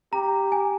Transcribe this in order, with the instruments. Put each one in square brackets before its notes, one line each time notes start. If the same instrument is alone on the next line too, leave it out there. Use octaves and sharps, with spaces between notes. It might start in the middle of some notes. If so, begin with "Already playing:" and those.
[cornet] G4 [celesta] A#5
[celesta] G#5